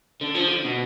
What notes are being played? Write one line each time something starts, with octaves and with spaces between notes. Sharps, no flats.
D3
F3
D3
B2